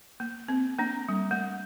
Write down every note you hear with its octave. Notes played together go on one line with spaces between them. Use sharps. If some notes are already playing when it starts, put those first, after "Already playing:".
A#3
C4
A#3 D4
G3
A3